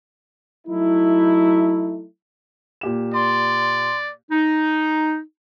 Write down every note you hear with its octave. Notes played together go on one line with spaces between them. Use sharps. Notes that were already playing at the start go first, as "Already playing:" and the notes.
F#3 A3 D#4 E4
A#2 G4 E7
D5 C6
D#4